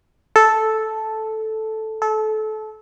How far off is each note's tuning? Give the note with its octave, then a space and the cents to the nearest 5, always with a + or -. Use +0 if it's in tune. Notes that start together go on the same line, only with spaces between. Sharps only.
A4 -5
A4 -25